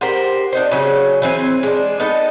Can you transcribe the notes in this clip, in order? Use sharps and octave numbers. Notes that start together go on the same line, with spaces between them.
G4 A#4 C5 F#5
D4 D#4 C5
C#3 F#3
E3 C4 D4 G#5
G#3 D4
B3 D#4 A4